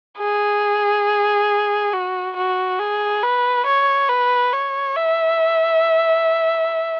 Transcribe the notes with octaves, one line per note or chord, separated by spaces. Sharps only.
G#4
F#4
F#4
G#4
B4
C#5
B4
C#5
E5